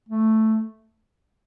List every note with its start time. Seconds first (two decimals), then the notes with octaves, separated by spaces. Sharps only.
0.09 A3